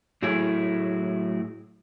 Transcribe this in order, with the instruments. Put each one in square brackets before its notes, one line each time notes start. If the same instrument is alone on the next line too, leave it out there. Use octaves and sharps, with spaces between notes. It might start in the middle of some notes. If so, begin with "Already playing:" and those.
[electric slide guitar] A2 F#3 A3 E4 G#4